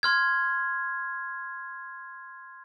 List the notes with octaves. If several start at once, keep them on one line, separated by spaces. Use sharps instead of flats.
C6 F6 G#6